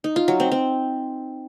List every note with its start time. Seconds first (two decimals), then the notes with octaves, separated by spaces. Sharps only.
0.04 D#4
0.16 F4
0.28 F#3
0.40 C4
0.52 C4